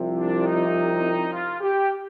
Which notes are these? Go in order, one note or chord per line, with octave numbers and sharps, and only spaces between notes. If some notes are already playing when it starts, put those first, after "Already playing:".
Already playing: C2 C3 F3
D4
D#4
F4
G4